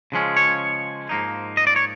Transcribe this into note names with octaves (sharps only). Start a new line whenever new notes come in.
C#3 F3 G#3 C#4
C#5
G#2 F3 A#3 D#4
D#5
D5
C#5